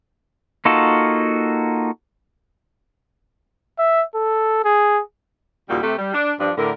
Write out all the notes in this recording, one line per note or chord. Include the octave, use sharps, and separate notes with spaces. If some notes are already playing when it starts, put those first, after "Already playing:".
A#3 D#4 F4 F#4 A4
E5
A4
G#4
D#2 A#2 C#3 G3 F4 F#4
C3 A3 G4
G3
D4
G2 F3 D4
A2 D3 A#4